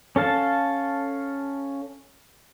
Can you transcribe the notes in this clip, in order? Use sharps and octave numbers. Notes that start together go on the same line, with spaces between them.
C#4 A4 F5 A5